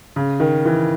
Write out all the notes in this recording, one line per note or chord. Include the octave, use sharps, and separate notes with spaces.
C#3
D#3
E3